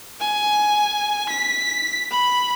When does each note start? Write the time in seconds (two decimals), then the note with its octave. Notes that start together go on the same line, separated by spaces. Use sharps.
0.21 G#5
1.30 B6
2.12 B5